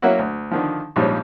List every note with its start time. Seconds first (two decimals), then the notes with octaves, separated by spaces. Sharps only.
0.02 F#3 A#3 C#4 E4 F#4
0.19 D2
0.51 D3 D#3 F3
0.96 A#1 G#2 F3 G3 C#4